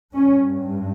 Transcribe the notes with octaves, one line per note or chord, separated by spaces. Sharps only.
G2 C#4